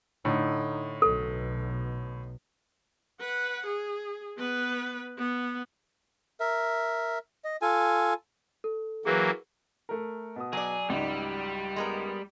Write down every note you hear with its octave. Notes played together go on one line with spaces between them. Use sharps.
A2 D3 D#4
B1 B2 A4
B4 F#5
G#4
B3 B4
B3
A#4 E5
D#5
F4 A4 G#5
A4
E3 F#3 A#3 G#4 A#4 B4
A3 A#4
B2 D#6
F#3 G#4 D5
C#2 G#2 G3
G#3 B3 A#4